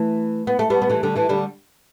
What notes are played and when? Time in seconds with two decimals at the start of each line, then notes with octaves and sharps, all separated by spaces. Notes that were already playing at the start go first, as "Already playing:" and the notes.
Already playing: E3 A3
0.47 B3
0.59 A3
0.70 G3 B3
0.82 B3
0.89 E3 A3
1.03 D3 G3
1.16 E3 A3
1.29 D3 G3